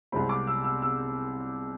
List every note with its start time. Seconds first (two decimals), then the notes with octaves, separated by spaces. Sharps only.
0.12 C2 C3 G#3 C4 B5
0.29 D6
0.47 E6
0.64 E6
0.82 E6